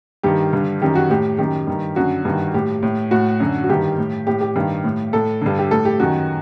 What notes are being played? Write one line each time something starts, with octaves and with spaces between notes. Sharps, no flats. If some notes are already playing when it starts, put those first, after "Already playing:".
G2 D#3 G4
G2 D3
F#2 D#3 G4
F#4
A2 G4
F#2 D#3 G4
G2 D#3
F#2 D3 F#4
G2 D#3
A2 G4
A2
A2 F#4
F#2 D3
F#4
G2 D#3 G4
A2
A2 G4
G4
G2 D#3 G4
A2
A2 A4
G2 D3
G4
A2 A4
G4
F#2 D#3 F#4